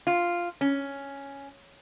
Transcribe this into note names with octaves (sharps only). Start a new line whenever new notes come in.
F4
C#4